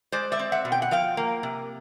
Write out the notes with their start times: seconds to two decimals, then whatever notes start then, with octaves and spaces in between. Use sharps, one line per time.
0.12 G#3 C5 D5
0.32 D5 E5
0.39 C4
0.52 E5 F#5
0.65 B2
0.72 G5
0.82 F#5
0.91 F3 F5 G5
1.17 A#3
1.43 C3